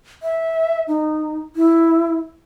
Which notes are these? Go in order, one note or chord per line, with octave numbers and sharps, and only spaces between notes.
E5
D#4
E4